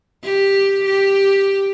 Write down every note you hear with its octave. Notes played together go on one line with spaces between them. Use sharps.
G4
G4